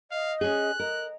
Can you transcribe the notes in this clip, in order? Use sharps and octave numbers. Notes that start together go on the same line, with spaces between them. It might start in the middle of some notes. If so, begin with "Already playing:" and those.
D#5 F5
C#4 G#4 F#6
A#4 D#5